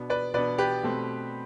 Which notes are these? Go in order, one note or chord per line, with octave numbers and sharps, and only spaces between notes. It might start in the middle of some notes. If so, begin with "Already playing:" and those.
Already playing: B2 B3 D4
B4 D5
B2 B3 D4 B4 D5
G4 B4
B2 A3 C4